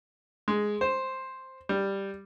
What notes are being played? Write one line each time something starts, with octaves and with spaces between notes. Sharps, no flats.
G#3
C5
G3